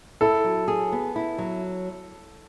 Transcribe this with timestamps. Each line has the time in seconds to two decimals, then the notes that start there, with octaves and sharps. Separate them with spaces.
0.21 E4 A4
0.44 F#3
0.68 G#4
0.92 B3
1.16 E4
1.38 F#3